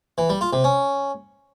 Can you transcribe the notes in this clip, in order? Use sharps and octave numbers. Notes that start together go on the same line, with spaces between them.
E3
G3
F4
C3
C#4